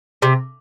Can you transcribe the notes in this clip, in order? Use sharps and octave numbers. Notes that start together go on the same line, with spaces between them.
C3